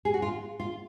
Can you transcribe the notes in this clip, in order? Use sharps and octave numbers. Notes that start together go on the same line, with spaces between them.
G#4
F#4
F4
F4